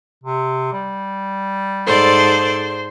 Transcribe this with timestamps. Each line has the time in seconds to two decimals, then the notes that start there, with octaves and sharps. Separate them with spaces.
0.24 C3
0.73 G3
1.87 G#2 A4 C5 D5